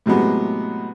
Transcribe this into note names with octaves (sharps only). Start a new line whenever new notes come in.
A2 C3 F#3 G#3 B3